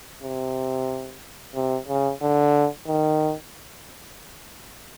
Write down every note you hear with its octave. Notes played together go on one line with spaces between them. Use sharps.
C3
C3
C#3
D3
D#3